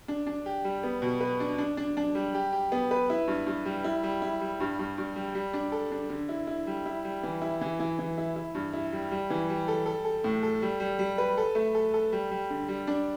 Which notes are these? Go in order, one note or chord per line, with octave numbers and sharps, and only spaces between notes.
D4
D4
G4
G3
B3
B2
B4
D4
D4
D4
D4
G3
G4
G4
B3
B4
E4
G2
G2
G3
E4
G3
E4
G3
G2
G2
G2
G3
G3
D4
A4
D4
D3
E4
E4
G3
E4
G3
E3
E4
E3
E3
E3
E4
E4
G2
E4
G3
G3
E3
G3
A4
A4
A4
A2
A4
G3
G3
G3
B4
A4
A3
A4
A4
G3
G3
D3
G3
D4